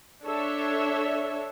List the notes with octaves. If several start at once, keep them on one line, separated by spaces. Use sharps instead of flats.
D4 A4 C#5 E5